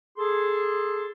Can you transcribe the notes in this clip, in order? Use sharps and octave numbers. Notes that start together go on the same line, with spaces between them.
G#4 A4 C6